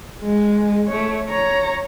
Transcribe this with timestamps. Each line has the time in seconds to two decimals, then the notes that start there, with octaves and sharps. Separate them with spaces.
0.22 G#3
0.87 A3 C#5
1.29 C#5 A#5